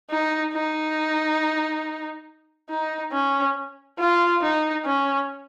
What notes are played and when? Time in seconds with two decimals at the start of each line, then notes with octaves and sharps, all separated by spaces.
0.10 D#4
0.54 D#4
2.70 D#4
3.12 C#4
3.99 F4
4.42 D#4
4.85 C#4